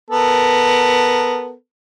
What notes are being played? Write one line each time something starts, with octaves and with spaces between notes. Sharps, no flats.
B3 A4 A#4